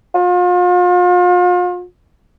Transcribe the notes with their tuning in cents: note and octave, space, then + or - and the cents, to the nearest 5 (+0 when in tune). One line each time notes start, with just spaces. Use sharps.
F4 +40